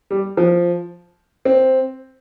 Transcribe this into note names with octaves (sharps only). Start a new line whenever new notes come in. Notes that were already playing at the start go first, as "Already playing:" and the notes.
G3
F3
C4